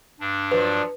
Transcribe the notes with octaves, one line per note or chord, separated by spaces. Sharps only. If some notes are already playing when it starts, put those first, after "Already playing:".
G2 D4
A#2 F3 F#3 B4